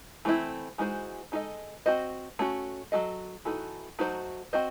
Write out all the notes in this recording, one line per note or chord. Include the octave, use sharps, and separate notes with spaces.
E3 A3 C4 E4
E3 G#3 D#4 F#4 C5
G#3 D#4 F#4 A4 D#5
C4 F#4 C5 D#5
A3 C#4 F#4
F#3 C4 F#4 A4 D#5
E3 A3 D#4 F#4 A4
F#3 A3 D#4 F#4 C5
C4 F#4 C5 D#5